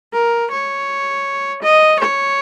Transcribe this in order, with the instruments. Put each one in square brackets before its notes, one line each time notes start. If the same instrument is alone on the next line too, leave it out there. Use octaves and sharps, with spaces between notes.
[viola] A#4
C#5
D#5
C#5